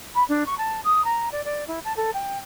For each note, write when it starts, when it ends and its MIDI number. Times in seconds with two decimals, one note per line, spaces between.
0.15 0.23 83
0.29 0.46 62
0.46 0.57 85
0.58 0.81 81
0.84 1.04 87
1.04 1.29 82
1.32 1.44 74
1.45 1.67 74
1.67 1.79 64
1.84 1.95 81
1.97 2.11 69
2.14 2.38 79